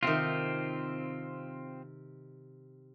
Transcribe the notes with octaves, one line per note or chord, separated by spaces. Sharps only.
C3 D#3 C4 F4